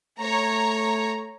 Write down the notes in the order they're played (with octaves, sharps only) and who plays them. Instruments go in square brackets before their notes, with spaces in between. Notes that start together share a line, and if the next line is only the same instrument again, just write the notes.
[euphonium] A3 [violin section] C#5 A#5